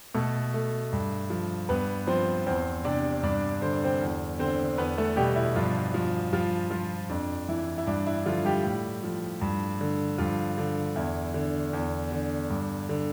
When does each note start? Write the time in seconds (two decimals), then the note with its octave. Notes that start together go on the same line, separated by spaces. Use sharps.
0.14 B2 A3 A4
0.54 A3
0.93 G2
1.30 F3
1.69 G2 B3 B4
2.07 F3 C4 C5
2.47 E2 C4 C5
2.85 C3 D4 D5
3.23 G2 D4 D5
3.62 D3 C5
3.73 D5
3.84 C4 C5
4.01 E2
4.39 D3 C4 C5
4.78 E2 B3 B4
4.97 A3 A4
5.16 B2 G3 G4
5.36 E4
5.56 G2 F3 F4
5.94 F3
6.33 G2 F3 F4
6.71 F3 F4
7.09 F2 D4
7.49 E3 E4
7.78 E4
7.87 G2 D4
8.07 E4
8.25 D3 F3 F4
8.45 G3 G4
8.64 A2
9.04 F3
9.41 G2
9.81 D3
10.18 G2 F3 F4
10.58 D3
10.96 E2 E4
11.34 D3
11.73 E2
12.12 D3
12.50 G2
12.89 D3